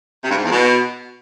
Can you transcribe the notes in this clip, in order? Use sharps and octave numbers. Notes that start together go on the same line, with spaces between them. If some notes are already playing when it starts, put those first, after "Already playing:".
C3
G2
G#2
E2
B2